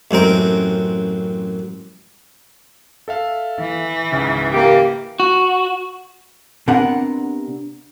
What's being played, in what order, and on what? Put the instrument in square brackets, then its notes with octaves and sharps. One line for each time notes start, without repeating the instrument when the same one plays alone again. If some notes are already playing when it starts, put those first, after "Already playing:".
[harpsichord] A1 F#2 C4 A#4
[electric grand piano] A4 E5 F5
[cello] E3
[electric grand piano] C#2 G#2 C#3
[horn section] A#3 G4
[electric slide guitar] F#4
[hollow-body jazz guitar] C3 B3 D4 A#4 F#5